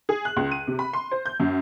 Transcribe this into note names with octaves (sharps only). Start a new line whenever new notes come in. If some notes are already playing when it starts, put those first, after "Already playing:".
G#4
F#6
C#2
D#7
C3
B5
C6
C5
G6
F#2